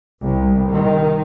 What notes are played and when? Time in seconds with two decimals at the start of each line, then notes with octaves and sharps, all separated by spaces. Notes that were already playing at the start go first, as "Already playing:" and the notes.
0.23 C2
0.71 D#3